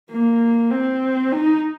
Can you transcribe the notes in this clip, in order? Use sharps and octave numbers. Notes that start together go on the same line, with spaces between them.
A#3
C4
D#4